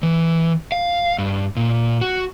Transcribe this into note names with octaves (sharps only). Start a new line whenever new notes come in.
E3
F5
G2
A#2
F#4